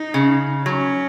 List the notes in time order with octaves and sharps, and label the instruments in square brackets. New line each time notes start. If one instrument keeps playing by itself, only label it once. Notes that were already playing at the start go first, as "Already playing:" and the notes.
Already playing: [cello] D#4
[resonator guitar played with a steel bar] C#3
[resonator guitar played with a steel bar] F#3 [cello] C#4